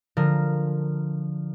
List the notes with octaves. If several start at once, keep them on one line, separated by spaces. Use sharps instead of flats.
D3 F3 A#4